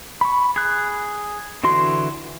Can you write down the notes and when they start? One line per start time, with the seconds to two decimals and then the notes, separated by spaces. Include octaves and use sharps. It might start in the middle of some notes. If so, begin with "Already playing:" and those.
0.21 B5 C#6
0.56 G#4 F#6
1.64 D3 E3 F#4 C6